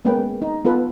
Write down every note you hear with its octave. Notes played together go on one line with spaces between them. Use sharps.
G#3 A#3 B3 C#4 B4 G5
G#4
D#4
B3 F4 A4 B4